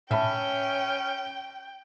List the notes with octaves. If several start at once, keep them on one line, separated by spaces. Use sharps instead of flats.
A2 C#4 E5 G5 A5 B5